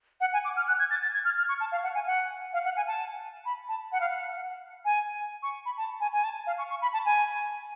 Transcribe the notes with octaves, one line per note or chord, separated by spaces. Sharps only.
F#5
G#5
D6
F6
F#6
G#6
A6
A6
G#6
F6
F6
C#6
A5
F5
F#5
G#5
F#5
F5
F#5
G#5
A5
B5
A5
F#5
F5
F#5
G#5
C#6
B5
A5
G#5
G#5
A5
F5
C#6
C#6
B5
A5
G#5